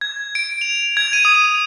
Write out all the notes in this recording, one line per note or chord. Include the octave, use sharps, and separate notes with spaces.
G#6
D7
F7
G#6
D#7
D#6